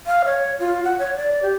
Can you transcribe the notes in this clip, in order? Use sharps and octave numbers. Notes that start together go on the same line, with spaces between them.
F5
C#5
F4
F#5
C#5
D5
G4